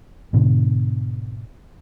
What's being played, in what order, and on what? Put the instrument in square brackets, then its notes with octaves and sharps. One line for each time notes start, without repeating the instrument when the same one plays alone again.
[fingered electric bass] G#2 B2 D3